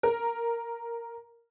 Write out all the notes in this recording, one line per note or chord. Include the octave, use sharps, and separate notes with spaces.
A#4